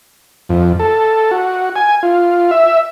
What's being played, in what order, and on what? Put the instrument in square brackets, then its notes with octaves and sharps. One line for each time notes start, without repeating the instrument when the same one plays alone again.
[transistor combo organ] F2
A4
F#4
G#5
F4
E5